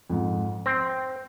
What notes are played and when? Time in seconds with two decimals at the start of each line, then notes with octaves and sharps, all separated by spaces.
0.10 F2 G#2
0.66 C4 A#6